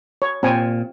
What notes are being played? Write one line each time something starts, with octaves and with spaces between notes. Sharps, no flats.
C#5
A#2 C4 G#5